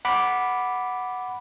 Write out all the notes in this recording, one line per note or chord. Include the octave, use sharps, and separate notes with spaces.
F#5 B5 D6